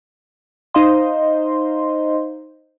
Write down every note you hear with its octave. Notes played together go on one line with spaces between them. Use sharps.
D#4 C5 D#5 F5 C6